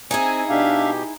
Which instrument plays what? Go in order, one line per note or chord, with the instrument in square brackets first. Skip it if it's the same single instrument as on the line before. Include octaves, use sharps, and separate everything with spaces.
[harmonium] C4 [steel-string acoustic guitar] D#4 E4 G#4 [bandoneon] G#5
[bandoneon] B2 G4 [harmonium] D4 E5 F5